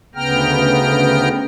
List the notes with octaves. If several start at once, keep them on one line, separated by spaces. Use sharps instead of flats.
D2 C#3 B3 G5 A#5 F6